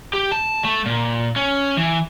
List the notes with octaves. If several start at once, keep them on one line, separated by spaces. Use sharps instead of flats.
G4
A5
A3
A#2
C#4
E3